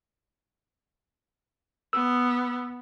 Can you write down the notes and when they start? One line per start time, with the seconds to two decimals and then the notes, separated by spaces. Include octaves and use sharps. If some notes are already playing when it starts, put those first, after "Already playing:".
1.93 B3 E6